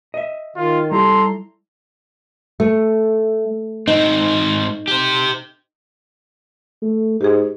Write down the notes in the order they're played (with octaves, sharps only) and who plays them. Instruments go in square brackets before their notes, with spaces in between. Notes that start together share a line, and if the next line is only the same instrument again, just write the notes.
[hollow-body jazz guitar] D#5 E5
[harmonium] D#3 [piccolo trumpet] F4
[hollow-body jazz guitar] G3 E4 G4 [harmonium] A4 A#5 [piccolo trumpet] C6
[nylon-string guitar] A3
[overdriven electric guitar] G#2 C4 [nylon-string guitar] D#4
[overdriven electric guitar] G4 C5
[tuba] A3
[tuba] G#2 [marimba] G4 G#4